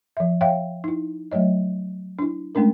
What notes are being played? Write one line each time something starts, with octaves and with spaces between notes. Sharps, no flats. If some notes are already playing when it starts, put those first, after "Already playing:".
F3 E5
C#5 E5 F5 G5
D#4 E4
F#3 A3 C#5 D#5
D4 E4
G#3 A3 C#4 D4 A#4